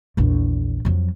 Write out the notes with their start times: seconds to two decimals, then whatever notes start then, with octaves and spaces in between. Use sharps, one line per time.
0.17 A#1 E2
0.85 F2 F#3